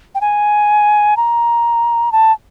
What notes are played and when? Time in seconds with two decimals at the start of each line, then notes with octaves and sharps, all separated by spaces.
0.15 G5
0.21 G#5
1.17 A#5
2.12 A5